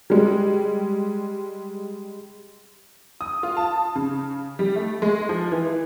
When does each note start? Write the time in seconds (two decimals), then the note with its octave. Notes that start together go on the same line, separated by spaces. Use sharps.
0.10 G3 G#3
3.21 D#6
3.43 F4
3.57 A5
3.96 C#3
4.59 G3
4.76 A3
5.02 G#3
5.29 F3
5.52 E3